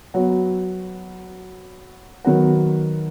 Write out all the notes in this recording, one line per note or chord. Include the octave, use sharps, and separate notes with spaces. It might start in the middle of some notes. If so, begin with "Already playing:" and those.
F#3 B3 F#4
D#3 F#3 B3 F#4